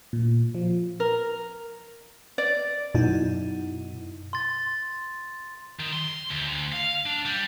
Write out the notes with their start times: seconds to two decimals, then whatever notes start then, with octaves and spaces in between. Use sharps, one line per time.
0.13 A#2
0.55 F3
1.00 A#4
2.38 D5
2.95 F#2 B2 D#4 E4
4.33 C6 A6
5.80 D#3
5.93 C6
6.30 D2
6.73 F5
7.06 D4
7.26 G3